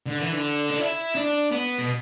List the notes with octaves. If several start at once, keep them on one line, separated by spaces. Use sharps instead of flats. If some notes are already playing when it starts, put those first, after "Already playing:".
D3
E3
D3
D4
E4
D4
B3
B2